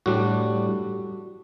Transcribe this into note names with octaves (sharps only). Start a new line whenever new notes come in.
A2 G3 D4 F#4